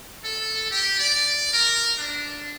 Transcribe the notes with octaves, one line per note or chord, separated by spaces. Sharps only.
A4
G4
D5
A#4
D4